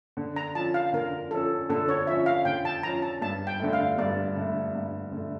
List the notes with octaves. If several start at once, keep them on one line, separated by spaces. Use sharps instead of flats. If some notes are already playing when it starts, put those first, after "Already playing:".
D3
A#5
F3 C#4 A5
F5
D3 A#4
F3 C#4 A4
D3 A4
C#5
F3 C#4 E5
F5
D3 G5
A5
F3 C#4 A#5
A5
G2 A5
G5
D3 A3
F5
G2 D5
D3 A3
G2
D3 A3